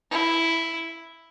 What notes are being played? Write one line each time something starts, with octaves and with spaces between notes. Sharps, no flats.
E4